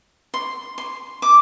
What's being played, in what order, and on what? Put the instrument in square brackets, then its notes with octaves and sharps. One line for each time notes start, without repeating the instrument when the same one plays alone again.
[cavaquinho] C6
C6
D6